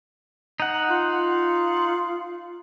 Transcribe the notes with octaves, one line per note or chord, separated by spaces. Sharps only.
D#4 F#5
F4